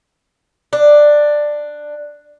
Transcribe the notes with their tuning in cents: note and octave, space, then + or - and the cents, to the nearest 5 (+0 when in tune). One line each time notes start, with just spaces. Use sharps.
D4 +10